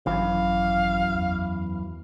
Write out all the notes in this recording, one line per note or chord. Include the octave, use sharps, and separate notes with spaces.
G#1 F#2 E3 F5
E2